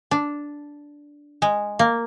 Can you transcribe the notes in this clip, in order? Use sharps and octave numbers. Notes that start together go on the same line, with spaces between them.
D4
G#3
A#3